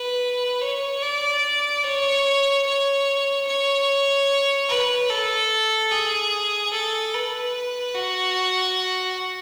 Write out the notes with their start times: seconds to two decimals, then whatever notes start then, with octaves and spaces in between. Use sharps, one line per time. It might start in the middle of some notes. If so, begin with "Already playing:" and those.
Already playing: B4
0.62 C#5
1.03 D5
1.84 C#5
2.66 C#5
3.47 C#5
4.69 B4
5.10 A4
5.91 G#4
6.73 A4
7.14 B4
7.95 F#4